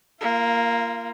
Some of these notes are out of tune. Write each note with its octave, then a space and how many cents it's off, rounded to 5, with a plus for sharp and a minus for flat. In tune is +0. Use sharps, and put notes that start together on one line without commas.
A#3 +0 F4 -30